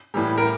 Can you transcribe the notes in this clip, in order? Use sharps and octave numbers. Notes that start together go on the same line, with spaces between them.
A2 E3 G3
A#4